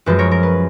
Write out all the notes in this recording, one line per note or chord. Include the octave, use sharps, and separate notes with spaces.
F#2 F3 G#3 B4
A#4 C#5
A#4
B4